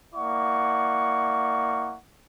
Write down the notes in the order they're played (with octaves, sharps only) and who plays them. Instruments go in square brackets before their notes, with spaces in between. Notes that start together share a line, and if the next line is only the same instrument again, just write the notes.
[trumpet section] A#3 E4 D5 F#5 C#6